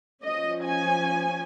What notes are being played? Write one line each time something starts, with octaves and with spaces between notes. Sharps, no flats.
F3 C#4 D#5
G#5